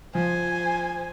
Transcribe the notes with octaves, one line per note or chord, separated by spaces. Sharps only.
F3 C5 G#5